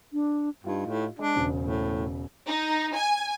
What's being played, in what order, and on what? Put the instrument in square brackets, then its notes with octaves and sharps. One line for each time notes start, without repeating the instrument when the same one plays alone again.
[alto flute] D4
[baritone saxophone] G2 [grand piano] D#4 F4 G4
[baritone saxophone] A2
[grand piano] G#3 [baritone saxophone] D4
[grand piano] E1 C#3 C5
[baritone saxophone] A2
[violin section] D#4
G#5